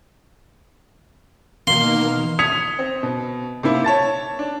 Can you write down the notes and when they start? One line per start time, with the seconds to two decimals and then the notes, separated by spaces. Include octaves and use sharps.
1.67 B2 D#3 E3 A#3 F5 C6
2.39 D#6 G#6 B6 C#7 F7
2.79 C4
3.03 B2
3.63 C3 A#3 E4
3.84 C#5 A5 A6
4.39 D4